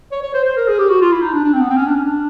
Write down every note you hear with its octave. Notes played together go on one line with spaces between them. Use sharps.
C#5
C#5
C5
C5
A#4
G#4
G4
F#4
F4
E4
D#4
D4
D4
C4
B3
C4
C#4
D4
C#4
D4